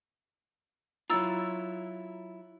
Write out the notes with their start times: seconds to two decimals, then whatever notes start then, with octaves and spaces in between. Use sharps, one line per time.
1.10 F#3 E4 F4 A#5 E6 A6